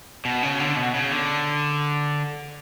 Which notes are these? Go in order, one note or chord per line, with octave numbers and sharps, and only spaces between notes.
B2
C#3
D3
B2
C#3
D3